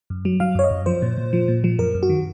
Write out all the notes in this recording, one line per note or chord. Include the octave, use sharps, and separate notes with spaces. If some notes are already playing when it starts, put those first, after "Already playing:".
F#2
F#3
F#3 F5
F#2 C#5
D#5
F#2
F3 C5
A#2
A#2
F3
A#2
F3
F#2 A#4
F#2
F#4
D#3